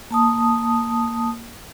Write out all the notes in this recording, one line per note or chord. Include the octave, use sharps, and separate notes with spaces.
A#3 A5 D#6